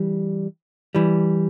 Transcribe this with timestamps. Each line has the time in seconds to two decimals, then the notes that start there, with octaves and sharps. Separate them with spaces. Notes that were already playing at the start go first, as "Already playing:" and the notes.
Already playing: E3 G3
0.95 E3 G3